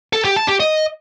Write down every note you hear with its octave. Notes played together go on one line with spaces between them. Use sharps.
A4
G4
A5
G4
D#5